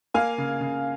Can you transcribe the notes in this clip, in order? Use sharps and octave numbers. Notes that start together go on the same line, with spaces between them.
A#3 F5 G#5
C#3
C#3